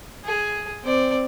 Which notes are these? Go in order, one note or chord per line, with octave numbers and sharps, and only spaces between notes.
G#4
C4 D5